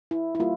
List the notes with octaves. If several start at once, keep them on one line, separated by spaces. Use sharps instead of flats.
E4
E4
G3 A#3 F4